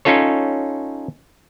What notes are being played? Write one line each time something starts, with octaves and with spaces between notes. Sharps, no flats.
C#4 D#4 F4 A4 C#5